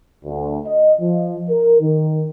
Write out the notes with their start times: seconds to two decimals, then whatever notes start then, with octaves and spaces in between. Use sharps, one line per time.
0.24 D2
0.66 D#5
1.00 F3
1.50 A#4
1.80 D#3